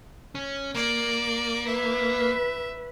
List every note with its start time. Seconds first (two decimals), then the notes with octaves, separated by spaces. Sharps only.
0.35 C#4
0.75 A#3 D5
1.67 B4 E5